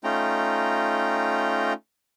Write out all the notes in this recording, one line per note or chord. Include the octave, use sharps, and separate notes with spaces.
A3 C#4 D#4 F4 G5 A#5